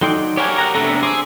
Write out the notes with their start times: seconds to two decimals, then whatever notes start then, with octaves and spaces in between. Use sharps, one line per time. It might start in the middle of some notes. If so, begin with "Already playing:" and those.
0.01 F#3 D#4 A4 D5 G5 C6
0.37 G4 A#4 C#5 D5 F#5 G#5
0.58 F#5 G5 A#5
0.75 C3 A3 B3 D4 A4 A#5
1.03 G#4 C5 D6 E6